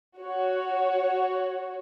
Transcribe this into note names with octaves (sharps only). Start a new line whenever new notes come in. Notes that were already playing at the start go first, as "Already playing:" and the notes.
F#4 C#5